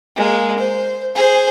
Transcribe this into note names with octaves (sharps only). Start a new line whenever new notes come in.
G#3 A#3
C5
G#4 C5